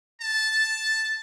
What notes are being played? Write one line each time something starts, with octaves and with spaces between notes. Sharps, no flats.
A5